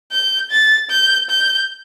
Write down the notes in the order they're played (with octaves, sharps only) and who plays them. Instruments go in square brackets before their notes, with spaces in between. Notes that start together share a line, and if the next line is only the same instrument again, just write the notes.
[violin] G6
A6
G6
G6